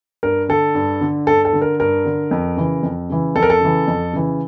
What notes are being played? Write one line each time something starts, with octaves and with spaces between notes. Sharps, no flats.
G2 A#4
D3 A4
G2
D3
G2 A4
A4
D3
A#4
G2 A#4
D3
F2
C#3 E3
F2
C#3 E3
F2 A4
A#4
A4
C#3 E3
F2
C#3 E3